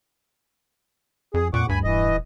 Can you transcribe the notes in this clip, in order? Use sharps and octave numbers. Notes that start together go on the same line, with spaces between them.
F2 G#4
F2 A#2 F#5 C#6 D6
D2 G2 G#5 B5
D#1 E3 D#5